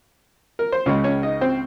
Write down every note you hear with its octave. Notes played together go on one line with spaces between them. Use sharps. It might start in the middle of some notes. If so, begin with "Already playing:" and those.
A#4
C5
C#2 C#3 G#3 C#4 C#5
C#4 C#5
D#4 D#5
C4 C5